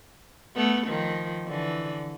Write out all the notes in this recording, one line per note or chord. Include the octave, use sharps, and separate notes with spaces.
A3 B3
D#3 F3
D3 E3